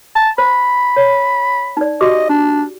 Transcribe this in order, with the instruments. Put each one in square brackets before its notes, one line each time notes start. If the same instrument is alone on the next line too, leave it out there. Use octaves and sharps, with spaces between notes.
[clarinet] A5
[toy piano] C5 [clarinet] B5
[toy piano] C#5
D#4 D5
[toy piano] F#4 G4 D6 [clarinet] D#5
[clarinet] D4